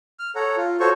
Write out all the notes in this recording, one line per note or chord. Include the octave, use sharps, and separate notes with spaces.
F6
A4 C#5 F#5 A#5
F4
F#4 A4 C5 C#5 C#6